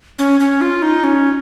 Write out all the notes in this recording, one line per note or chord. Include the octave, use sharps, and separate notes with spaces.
C#4
C#4
F4
D#4
C#4